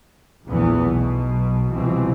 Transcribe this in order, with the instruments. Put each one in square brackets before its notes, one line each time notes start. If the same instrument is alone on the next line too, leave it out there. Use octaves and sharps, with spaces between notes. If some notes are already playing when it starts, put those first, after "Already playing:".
[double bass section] A#1 E2 A#2 E3 A3 B3
B1 B2
C2 B2 E3 F3 C4